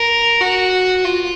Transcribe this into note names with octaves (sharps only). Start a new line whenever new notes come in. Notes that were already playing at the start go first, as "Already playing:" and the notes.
Already playing: A#4
F#4
F4